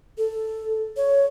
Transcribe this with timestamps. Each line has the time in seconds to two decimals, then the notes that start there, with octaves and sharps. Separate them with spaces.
0.18 A4
0.97 C#5